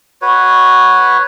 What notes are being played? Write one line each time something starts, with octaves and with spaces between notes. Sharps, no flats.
F#4 B4 C#5